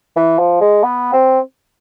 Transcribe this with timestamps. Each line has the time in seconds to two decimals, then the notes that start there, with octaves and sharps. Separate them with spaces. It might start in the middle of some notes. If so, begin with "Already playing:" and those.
0.16 E3
0.39 F3
0.61 G#3
0.83 B3
1.13 C4